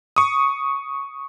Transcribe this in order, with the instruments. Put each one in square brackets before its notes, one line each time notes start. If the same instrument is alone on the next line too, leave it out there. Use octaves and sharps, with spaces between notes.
[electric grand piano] C#6 D#6